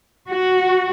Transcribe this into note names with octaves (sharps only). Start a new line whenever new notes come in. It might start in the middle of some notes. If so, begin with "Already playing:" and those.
F#4